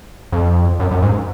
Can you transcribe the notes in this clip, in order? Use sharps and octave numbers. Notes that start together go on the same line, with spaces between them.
F2
F#2
F#2
G#2